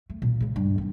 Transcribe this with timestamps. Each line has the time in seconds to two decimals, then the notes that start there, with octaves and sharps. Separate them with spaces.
0.10 A3
0.22 A#2
0.41 C#3 G#3
0.56 G2
0.78 D#3 A#3